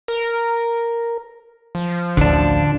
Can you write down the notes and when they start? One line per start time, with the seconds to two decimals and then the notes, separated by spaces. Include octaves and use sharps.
0.08 A#4
1.75 F3
2.17 A1 D2 D3 D4